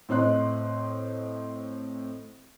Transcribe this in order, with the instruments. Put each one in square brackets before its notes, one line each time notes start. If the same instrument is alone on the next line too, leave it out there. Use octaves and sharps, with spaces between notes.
[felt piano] A2 C4 D#5 C6 F#6